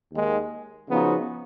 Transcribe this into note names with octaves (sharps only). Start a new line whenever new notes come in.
D#2 D#3 G#3
C#3 F3 B3 D#4 F#4